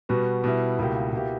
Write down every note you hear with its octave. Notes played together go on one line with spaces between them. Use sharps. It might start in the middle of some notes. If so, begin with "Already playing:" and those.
B2 G3 B3 F#4
B2 G3 B3 E4
C#2 B2 A#3 E4 G4
B2 A#3 E4 G4